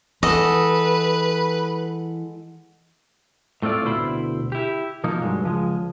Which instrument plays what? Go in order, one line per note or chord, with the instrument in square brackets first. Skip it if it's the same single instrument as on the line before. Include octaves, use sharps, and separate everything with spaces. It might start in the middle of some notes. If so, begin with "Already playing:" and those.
[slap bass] E3 [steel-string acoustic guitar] G#3 A4 F#5 [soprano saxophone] B4 [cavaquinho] D#5
[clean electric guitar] A2 A3 C4 F4 D5
D2 B2 E4 C5 B5
E4 G4
B2 F3 A#3 D#4
G2 F#3 G#3
C#2 F3 G#3